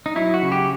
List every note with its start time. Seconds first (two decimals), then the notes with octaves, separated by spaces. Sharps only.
0.06 D#4
0.16 F#3 E4
0.34 F#4
0.43 C#3
0.52 G4